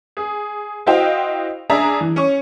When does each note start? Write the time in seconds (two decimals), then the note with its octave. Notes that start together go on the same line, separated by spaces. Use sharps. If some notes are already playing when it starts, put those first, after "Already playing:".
0.17 G#4
0.86 E4 F#4 C5 D#5 F5 G5
1.70 D4 G#4 D5 E5 A#5
2.01 E3
2.16 C#4 C#6